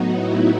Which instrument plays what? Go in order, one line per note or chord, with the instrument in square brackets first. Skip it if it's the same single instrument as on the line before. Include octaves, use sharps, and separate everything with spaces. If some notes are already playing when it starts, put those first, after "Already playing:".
Already playing: [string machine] A2 F#3 B3 D#4 F#4
E4